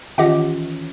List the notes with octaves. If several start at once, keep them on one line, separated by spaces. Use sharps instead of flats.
D#3 E3 C#4 F4 G4 D#5 F#5 D6